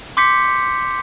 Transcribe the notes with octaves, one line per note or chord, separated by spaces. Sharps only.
C6 D6 G6 B6 C#7